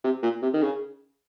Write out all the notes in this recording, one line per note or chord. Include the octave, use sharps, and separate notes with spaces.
C3
A#2
C3
D#3
C#3